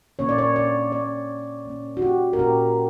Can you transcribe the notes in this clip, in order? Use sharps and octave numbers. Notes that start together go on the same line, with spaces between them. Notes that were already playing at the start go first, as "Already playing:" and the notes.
A#2 A#3 C#4 C#5
D5
C#5
D5
A#2 A#3 C#4 D5
A#2 A#3 C#4
F#4
G4
A#4
A#2 A#3 C#4 G4